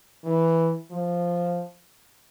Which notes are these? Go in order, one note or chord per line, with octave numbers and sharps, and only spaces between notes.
E3
F3